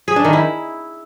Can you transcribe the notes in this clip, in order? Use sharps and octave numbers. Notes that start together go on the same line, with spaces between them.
G#4
D4
D#3
E4